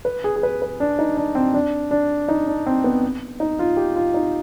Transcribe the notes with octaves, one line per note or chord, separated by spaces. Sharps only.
B4
G#4
G#4
B4
B4
D4
D#4
D4
C4
D4
D4
D#4
D4
C4
B3
D#4
F4
G4
F4
D#4